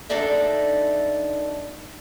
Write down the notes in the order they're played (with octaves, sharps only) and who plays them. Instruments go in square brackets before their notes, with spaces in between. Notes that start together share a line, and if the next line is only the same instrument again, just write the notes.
[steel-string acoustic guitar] F#2 D4 D#4 A4 D5 E5